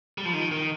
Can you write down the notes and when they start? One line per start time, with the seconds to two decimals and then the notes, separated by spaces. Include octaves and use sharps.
0.18 G3
0.25 F3
0.33 D#3
0.51 D#3